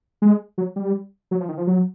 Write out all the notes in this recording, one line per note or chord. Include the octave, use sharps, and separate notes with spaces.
G#3
F#3
G3
F#3
F3
D#3
F3
F#3